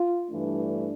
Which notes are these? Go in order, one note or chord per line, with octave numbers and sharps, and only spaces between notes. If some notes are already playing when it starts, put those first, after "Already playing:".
Already playing: F4
G2 E3 A3 D4